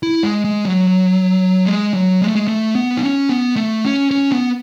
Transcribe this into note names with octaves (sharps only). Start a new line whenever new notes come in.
E4
G#3
G#3
F#3
G#3
F#3
G#3
A3
G#3
A3
B3
D#4
C#4
B3
A3
C#4
C#4
B3